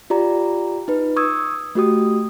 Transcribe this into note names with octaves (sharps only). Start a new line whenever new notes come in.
F4 G4 D5 A#5
D#4 B4
C#6 D#6 E6 G#6
A3 F#4 G4 D#6